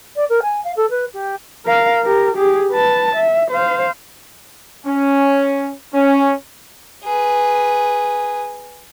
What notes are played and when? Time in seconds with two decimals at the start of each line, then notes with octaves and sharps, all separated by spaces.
0.16 D5
0.29 A#4
0.42 G#5
0.64 F5
0.77 A4
0.90 B4
1.14 G4
1.65 A#4 F5
2.04 G4 A#4
2.35 G4 G#4
2.72 B4 A5
3.16 E5
3.51 C5 F5
4.86 C#4
5.94 C#4
7.04 G#4 B4